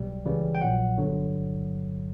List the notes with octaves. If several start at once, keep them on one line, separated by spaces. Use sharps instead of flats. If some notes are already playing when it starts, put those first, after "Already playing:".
Already playing: B1 B2 G3
C#2 C#3 E3 G3
G5
A#1 A#2 F#3 F#5
G1 G2 D3 F#3